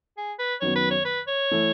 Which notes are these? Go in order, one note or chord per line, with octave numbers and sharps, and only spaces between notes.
G#4
B4
F#2 D#3 F#3 B3 C#5
B4
C#5
B4
C#5
E3 A3 E4